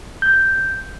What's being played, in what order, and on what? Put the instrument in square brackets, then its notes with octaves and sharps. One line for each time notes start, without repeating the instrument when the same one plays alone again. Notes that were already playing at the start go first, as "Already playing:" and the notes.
[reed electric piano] G6